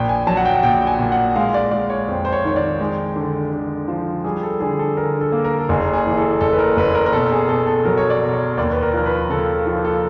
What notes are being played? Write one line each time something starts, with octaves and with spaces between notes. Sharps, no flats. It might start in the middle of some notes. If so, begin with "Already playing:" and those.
Already playing: A#1 G5
G#5
F#3 A5
F#5
G5
A#1 G5
G5
G#5
A#2
F#5
G#3 F5
D5
G#3 D5
C#5
F2 C5
C5
C#5
D#3 C#5
D5
G#3
D3
D3
F3
G3 G#4
A4
D3 G#4
A4
D3 A#4
A4
A#3
A#4
A4
F#1 G#4
G#4
E3
G#4
A4
F#1 A4
B4
A#4
F#1 B4
A#4
A#4
B2 A4
G#4
B2 A4
A4
F#3 A#4
C#5
D5
B2
C#5
D#2 D5
B4
A#4
F3 A#4
B4
C#3 A4
F3 A4
A4